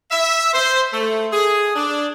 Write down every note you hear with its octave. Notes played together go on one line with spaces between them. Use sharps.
E5
C5
A3
G#4
D4